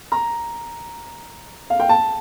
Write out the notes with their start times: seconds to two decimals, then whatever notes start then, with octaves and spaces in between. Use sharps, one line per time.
0.12 A#5
1.70 F5
1.80 G5
1.89 A5